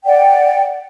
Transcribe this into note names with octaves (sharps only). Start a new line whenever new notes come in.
D5 F#5 G5